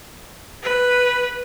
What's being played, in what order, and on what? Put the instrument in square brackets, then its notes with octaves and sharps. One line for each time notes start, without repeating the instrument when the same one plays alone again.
[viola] B4